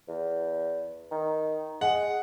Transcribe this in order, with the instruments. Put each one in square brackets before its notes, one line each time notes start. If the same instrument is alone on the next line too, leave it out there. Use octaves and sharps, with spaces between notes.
[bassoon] E2
D#3
[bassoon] G#3 [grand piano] F#5